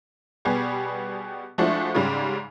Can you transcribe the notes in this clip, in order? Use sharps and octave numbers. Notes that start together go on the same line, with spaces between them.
B2 G3 B3 G4 G#4
F3 G#3 A3 D4 E4 F#4
G#2 C#3 G3